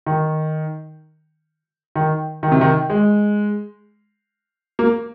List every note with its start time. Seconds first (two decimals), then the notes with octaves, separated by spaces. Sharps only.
0.07 D#3
1.96 D#3
2.43 D#3
2.52 C3
2.61 D#3
2.90 G#3
4.79 A#3